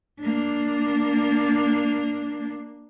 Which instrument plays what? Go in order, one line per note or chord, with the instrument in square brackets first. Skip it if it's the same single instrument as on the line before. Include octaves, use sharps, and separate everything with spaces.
[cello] A#3 D4